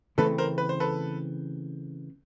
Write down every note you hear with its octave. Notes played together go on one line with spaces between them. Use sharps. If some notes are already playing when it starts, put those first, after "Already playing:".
C#3 E3 A3 C4 A4 B4
A#4 C5
B4
C5
A4 B4